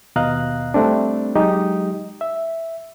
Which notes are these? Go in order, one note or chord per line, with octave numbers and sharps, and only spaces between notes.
D#2 B2 D#5 F5 A#5 F#6
G3 A3 C4 D4
F#3 G#3 D#4 G4 D#5
E5